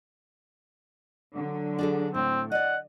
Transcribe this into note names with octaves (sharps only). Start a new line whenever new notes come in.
D3 F#3
D4 G#4 A4
A2 C4
D5 D#5 F#5